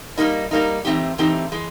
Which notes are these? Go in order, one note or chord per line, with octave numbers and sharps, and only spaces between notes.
G3 A#3 D#4
G3 A#3 D#4
E3 A3 C4 D#4 G4
E3 A3 C4 D#4 G4
E3 G#3